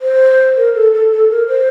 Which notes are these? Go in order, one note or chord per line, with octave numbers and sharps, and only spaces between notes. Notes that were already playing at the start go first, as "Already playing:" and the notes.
C5
A#4
A4
A4
A4
A#4
C5